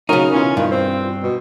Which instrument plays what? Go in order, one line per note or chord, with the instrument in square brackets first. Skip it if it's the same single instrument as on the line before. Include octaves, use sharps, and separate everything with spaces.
[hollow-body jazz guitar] C#3 D#4 [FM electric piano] F#3 C#4 [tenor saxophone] A#4
[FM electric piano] B2 E3 F4 [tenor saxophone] C#4
[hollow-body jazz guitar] G2 [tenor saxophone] D#3
[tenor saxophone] C4
B2